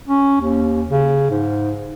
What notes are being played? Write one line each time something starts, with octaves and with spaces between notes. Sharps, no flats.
C#4
D#2
C#3
G#2